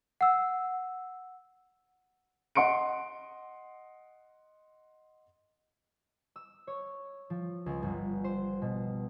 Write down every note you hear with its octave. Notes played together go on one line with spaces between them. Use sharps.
F#5 E6
D#5 F#5 C6 C#7 D7
E6
C#5
F3
C#2
G1
C5
B2